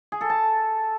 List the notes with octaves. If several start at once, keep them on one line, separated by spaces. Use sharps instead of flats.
G#4
A4
A5